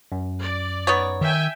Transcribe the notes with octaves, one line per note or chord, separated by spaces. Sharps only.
F#2
D5
B3 D#4 C#5
D#3 E5 G5 G#5